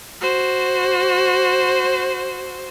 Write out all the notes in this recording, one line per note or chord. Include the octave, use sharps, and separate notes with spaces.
F#4 C5